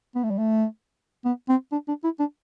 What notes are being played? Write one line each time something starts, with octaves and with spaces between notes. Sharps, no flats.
B3
A3
G3
A3
B3
C4
D4
D4
E4
D4